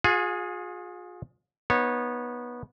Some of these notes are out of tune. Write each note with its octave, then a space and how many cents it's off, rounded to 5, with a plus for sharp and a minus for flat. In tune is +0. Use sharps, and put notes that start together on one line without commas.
F4 +40 G#4 +0 F#5 -35
B3 -20 D#4 +0 C#5 -20